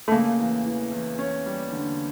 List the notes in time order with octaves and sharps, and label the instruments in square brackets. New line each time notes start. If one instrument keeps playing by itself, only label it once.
[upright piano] A3
[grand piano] C#3 [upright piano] A#3
[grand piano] E2
E3
E2
C#4
G3
D3